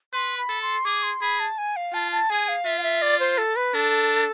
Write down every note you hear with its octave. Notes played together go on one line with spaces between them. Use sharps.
B4 C6
B5
A4
C6
G#4 D6
C6
G#4 B5
A5
G#5
F5
F4 A5
A5
G#4 G#5
F5
F4 E5
F5
E5
D5
C5
A4
B4
D4 A4